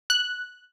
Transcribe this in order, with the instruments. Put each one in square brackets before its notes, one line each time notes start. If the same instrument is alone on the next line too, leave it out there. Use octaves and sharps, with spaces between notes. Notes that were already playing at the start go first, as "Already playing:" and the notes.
[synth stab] F#6